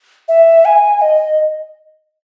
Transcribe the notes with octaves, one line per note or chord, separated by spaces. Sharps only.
E5
G#5
D#5